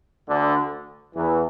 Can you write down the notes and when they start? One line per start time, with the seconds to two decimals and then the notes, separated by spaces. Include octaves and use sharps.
0.28 D2 D3
1.14 E2 E3